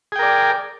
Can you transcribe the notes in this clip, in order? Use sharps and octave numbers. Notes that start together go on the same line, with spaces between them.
G#4 A#4 D5 G5